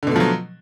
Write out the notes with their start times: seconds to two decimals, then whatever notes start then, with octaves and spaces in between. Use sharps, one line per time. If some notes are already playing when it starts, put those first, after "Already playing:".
0.03 D3
0.07 B2
0.11 A3
0.16 F3
0.20 F#3